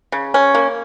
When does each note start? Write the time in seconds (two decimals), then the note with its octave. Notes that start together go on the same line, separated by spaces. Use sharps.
0.12 C#3
0.34 C#4
0.55 A#3